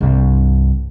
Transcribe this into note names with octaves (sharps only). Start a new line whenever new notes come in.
C2 G2